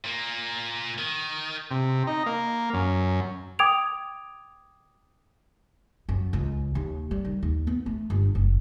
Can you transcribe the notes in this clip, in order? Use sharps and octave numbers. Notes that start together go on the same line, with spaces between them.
A#2 A#3
D#3
C3
D#4
A#3
F#2
G5 D6 D#6 G#6 D7 F7
F#2
C#2
D#2
G3
D#3
D#2
B3
A3
G1
F#1